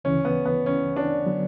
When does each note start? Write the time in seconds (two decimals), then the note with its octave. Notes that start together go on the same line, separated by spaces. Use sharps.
0.04 D2 C#3 E3 C#4
0.25 B3
0.46 B3
0.66 C#4
0.96 D4
1.26 D3 F#3 B3